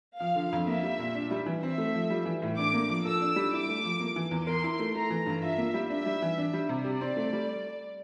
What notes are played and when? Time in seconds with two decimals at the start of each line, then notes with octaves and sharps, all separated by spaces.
0.20 F3 F5
0.35 D3
0.52 F2
0.67 A#3 E5
0.83 G3
0.99 A#2
1.15 D4
1.31 G3
1.46 E3
1.63 C4 E5
1.78 A3
1.94 F3
2.10 G3
2.26 E3
2.42 A2
2.57 D4 D6
2.73 A#3
2.89 F3
3.05 A4 E6
3.21 D4
3.36 G3
3.52 E4 D6
3.69 A3
3.84 F3
4.00 A#3
4.16 E3
4.31 E2
4.47 A#4 C6
4.64 E4
4.79 A3
4.95 A3 A#5
5.10 E3
5.26 G2
5.42 F4 E5
5.58 A#3
5.74 G3
5.90 D4 E5
6.06 G3
6.22 E3
6.38 D4
6.53 G3
6.69 C3
6.84 G4 D5
7.01 C4
7.16 A3
7.33 G3